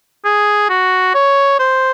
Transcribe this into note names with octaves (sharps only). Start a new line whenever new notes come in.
G#4
F#4
C#5
C5